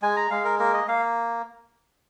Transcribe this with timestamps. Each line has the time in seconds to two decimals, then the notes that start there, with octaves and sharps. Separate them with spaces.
0.02 G#3 G#5
0.17 A#5
0.31 G#3 F5
0.45 A#4
0.59 A#3 A#4
0.74 D#5
0.88 A#3 F5